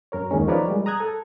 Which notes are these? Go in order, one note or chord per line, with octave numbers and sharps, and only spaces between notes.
F#2 A#4 C#5
D#2 D#3 G#3 C#4
F3 D#4 A#4 B4 C#5 D5
G3 G#3
A#5 D#6 F#6 G#6
A4